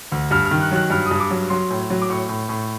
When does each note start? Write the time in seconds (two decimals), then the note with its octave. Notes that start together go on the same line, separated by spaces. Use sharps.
0.12 D2
0.31 G2 F6
0.45 F6
0.51 D#3
0.61 F#6
0.71 F#3 F#6
0.90 G2 F6
1.06 D#6
1.11 G2
1.20 D6
1.30 F#3
1.50 F#3 C6
1.70 A2
1.90 F#3
2.02 D6
2.10 A2 C#6
2.29 A2
2.49 A2